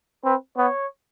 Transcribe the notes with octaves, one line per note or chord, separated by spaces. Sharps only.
C4 B4
B3 C#5